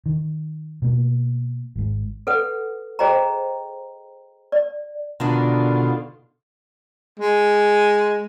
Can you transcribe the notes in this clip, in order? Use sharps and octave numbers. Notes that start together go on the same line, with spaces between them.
D#3
B2 A#3
G#1 G#2
A4 B4 F#5
G#4 C5 D#5 G5 A#5
D5
B2 D3 D#3 D4 F4
G#3